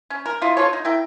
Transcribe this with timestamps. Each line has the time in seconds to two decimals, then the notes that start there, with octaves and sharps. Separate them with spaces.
0.10 C#4
0.26 A#4
0.42 E4 F4 D#5
0.57 F4 A4 C#5
0.73 D#4
0.85 E4 A#4 G5